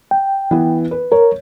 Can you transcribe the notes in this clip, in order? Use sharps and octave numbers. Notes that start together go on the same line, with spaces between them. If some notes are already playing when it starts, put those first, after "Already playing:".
G5
E3 B3
B4
A#4 C#5